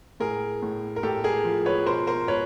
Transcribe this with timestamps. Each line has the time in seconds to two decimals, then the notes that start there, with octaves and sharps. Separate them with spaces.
0.20 A2 G#4 A#4
0.62 A2
0.96 A#4
1.03 A2 G4 A4
1.24 G#4 A#4
1.45 F3
1.66 B4 C#5
1.86 B2 A#4 C5
2.07 A#4 C5
2.27 B2 B4 C#5